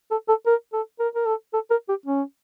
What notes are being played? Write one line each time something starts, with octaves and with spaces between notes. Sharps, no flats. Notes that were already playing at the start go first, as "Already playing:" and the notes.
A4
A4
A#4
A4
A#4
A#4
A4
A4
A#4
G4
C#4